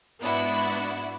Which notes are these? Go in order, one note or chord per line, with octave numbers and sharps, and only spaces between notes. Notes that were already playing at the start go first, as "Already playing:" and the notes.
G#2 B3 D4 E4 F#4